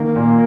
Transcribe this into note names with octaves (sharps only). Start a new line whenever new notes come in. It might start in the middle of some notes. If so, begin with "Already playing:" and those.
Already playing: D#3 A#3
A#2